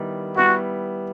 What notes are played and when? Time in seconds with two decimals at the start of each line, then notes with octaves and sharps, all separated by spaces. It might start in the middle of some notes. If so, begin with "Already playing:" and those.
Already playing: D#3 G3 B3 E4
0.35 G3 B3 E4 F#4